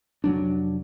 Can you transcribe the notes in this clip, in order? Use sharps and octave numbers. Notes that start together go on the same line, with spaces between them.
F1 F#3 D4